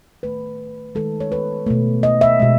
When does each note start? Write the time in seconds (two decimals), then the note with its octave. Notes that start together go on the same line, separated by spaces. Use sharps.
0.23 D#3 A3 B4
0.95 D#3 G#3 A4
1.20 C#5
1.32 B4
1.67 B2 A3
2.03 D#5
2.21 E5
2.40 B2 G#3